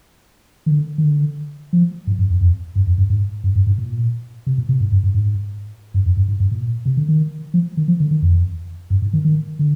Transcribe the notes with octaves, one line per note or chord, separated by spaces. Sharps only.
D#3
D3
D#3
D3
F3
G#2
G2
F2
F2
G2
F2
G2
G#2
G2
G2
G#2
A#2
C3
A#2
C3
G#2
G2
G2
G#2
G2
F2
G2
G#2
G2
A#2
C3
D3
D#3
F3
D#3
F3
D3
D#3
F2
G2
G#2
D#3
D#3
D3